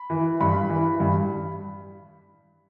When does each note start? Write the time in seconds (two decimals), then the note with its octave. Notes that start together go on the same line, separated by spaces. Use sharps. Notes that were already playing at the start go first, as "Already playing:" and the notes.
Already playing: B5
0.10 E3
0.41 G2 B5
0.70 E3
1.00 G2